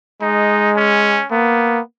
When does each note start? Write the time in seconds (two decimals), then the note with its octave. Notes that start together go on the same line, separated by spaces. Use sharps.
0.22 G#3 D#4
0.77 C#4
1.31 A#3 B3